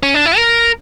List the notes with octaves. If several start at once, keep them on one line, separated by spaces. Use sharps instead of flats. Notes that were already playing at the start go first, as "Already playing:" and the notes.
C#4
D4
E4
A#4